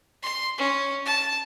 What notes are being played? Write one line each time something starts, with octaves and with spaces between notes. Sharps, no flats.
C6
C#4
A5